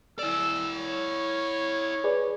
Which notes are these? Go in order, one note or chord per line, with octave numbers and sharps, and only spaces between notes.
E4 D5 E6
C#5
G#4 B4 D5